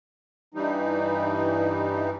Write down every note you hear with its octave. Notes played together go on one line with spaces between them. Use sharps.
G2 E3 G3 D#4